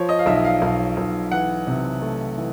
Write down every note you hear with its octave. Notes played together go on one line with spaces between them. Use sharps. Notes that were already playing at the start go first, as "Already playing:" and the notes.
Already playing: F3 C#5
D#5
F5
B1 E5
F5
B1
B1
E3 F#5
C3
A3
E3